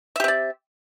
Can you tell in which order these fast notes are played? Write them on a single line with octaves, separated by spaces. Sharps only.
E5 G4 C4 D5